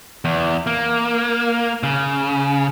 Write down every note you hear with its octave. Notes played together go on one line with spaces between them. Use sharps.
E2
A#3
C#3